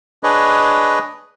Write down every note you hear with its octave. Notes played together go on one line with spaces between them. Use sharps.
D4 G#4 B4 C#5 D#5